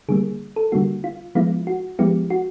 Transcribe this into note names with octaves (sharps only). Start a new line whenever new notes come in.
D3 G3 A#3 G#4
A4
D3 G3 A#3 F#4
F4
F3 G#3 B3 E4 F4
F#4
F3 G#3 B3 E4 G4
F#4